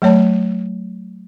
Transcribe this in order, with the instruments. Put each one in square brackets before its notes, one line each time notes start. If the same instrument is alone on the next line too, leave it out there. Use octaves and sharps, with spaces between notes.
[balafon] F#3 A3 C#5 A5